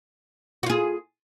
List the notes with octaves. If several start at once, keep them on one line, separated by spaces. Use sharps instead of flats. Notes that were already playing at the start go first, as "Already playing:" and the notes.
F4 F#4 G#4